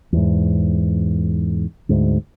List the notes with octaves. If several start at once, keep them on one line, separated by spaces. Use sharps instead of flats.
E2 G#2
D2 G#2